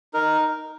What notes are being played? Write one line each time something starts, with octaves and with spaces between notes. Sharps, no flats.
D#4 A#4